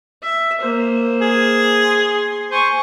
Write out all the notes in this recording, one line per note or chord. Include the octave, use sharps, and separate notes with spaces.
E5
A#3 C5
G#4
C6
C5 G#5 C#6